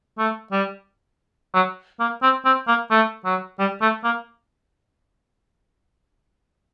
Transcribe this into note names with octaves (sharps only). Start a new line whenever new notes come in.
A3
G3
F#3
A#3
C4
C4
A#3
A3
F#3
G3
A3
A#3